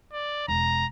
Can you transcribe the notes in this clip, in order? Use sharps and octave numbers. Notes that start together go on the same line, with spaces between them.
D5
E1 A#5